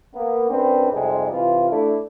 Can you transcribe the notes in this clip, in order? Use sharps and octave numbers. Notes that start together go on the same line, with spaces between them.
A#3 B3
F#2 C4 D4 B4
F2 G#2 C3 G3 G#3
C3 E3 F4
A3 D4 E4